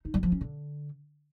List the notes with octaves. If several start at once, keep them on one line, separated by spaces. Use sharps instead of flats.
D#4
G3
F3
C#4
D3